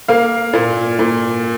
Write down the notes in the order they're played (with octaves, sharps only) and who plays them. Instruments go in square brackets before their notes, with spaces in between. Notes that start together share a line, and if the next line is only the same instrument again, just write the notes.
[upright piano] A#3 F5
A#2
A#2